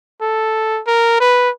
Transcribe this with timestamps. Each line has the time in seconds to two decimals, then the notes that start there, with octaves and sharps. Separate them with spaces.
0.21 A4
0.87 A#4
1.20 B4